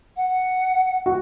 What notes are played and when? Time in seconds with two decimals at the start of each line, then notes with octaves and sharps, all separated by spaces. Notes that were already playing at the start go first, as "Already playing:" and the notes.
0.17 F#5
1.06 F#4